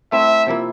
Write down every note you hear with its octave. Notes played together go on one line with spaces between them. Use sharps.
A3 C4 E4 E5
C3 F3 A#3 E4